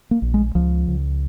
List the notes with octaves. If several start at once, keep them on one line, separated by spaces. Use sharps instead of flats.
A#3
A#1
G#3
C#2 F3
C#2